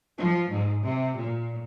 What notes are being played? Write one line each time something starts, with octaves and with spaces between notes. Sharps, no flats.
F3
G#2
C3
A#2